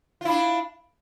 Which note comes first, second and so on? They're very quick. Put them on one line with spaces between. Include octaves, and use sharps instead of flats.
F4 E4 D4